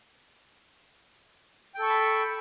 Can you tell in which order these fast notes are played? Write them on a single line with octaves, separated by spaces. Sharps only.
G5 A4 C#6 A5 B5